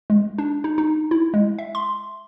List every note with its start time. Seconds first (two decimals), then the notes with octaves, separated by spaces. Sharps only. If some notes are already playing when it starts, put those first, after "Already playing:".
0.10 G#3
0.38 D4
0.64 D#4
0.78 D#4
1.11 E4
1.34 G#3
1.59 E5
1.75 C6